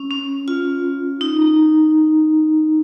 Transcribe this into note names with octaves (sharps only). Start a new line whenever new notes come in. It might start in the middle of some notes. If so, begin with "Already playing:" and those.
Already playing: C#4
C#4
F4
D#4